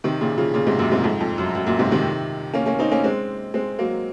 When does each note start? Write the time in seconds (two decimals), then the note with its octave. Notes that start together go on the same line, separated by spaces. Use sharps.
0.04 C3 D#3
0.21 A#2 C#3
0.38 C#3 F3
0.54 A#2 C#3
0.67 G#2 C3
0.79 F#2 A#2
0.91 G#2 C3
1.04 F2 G#2
1.20 F2
1.38 F#2
1.55 F#2
1.67 F#2 A#2
1.79 G#2 C3
1.91 C3 D#3
2.54 A#3 C#4
2.66 A#3 C#4
2.79 C4 D#4
2.91 A#3 C#4
3.04 G#3 C4
3.54 G#3 C4
3.79 F#3 A#3